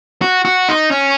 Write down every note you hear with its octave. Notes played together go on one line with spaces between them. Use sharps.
F#4
F#4
D#4
C#4